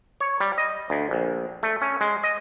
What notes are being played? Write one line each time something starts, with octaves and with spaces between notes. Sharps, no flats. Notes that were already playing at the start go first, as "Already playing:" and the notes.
C#5
G3
D#5
D2
A#1
A3
C#4
G#3
D#5